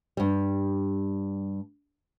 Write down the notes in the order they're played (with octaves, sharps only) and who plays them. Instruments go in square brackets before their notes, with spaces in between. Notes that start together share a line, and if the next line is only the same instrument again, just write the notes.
[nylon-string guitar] G2 G3